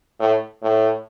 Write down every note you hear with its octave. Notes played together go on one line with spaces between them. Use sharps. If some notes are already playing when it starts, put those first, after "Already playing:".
A2
A2